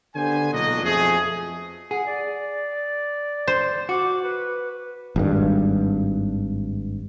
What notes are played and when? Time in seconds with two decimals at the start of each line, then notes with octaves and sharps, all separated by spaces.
0.14 D3 B3 G4 C5 G#5
0.52 B1 A#2 G#3 D4 F#4 D#5
0.82 F2 B2 A3 G#4
1.91 G#4 F#5
2.06 D5
3.47 C5
3.89 F#4 D6
4.23 B4
5.16 G#1 G2